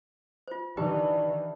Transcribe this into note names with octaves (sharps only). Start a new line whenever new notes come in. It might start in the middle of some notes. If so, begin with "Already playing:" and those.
F4 C5
D#3 E3 D4 G4 B4 G5